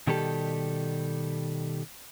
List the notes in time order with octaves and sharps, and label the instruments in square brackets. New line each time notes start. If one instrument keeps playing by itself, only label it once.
[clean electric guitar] B2 D#3 G3 G4 A4